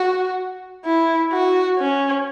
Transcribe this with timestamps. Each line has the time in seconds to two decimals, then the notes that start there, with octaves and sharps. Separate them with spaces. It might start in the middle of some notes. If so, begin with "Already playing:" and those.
Already playing: F#4
0.85 E4
1.32 F#4
1.79 C#4